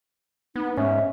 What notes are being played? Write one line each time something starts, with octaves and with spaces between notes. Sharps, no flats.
B3 D#4
G#2 C#4 E5